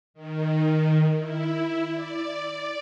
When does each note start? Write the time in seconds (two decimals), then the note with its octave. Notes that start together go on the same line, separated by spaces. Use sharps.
0.14 D#3
1.17 E4
1.91 D5